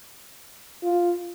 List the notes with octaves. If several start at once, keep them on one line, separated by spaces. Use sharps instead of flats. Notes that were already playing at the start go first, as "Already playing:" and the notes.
F4